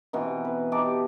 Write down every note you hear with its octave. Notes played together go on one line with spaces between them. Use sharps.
B2 E3 C4 D#4
B4
D#4 G4 A5 D6